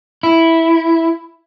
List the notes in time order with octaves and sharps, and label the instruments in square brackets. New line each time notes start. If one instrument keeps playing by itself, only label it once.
[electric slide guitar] E4